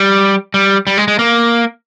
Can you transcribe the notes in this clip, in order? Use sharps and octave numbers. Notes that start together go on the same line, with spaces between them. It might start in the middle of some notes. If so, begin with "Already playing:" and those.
Already playing: G3
G3
G3
G#3
G#3
A#3